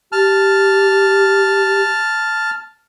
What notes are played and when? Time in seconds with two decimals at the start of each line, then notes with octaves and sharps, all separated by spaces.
0.12 G4 A5 F6